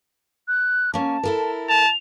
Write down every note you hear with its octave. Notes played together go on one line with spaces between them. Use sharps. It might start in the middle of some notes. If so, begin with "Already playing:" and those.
F#6
A#3 C#4 A5
E4 A4 A#4
A5 F7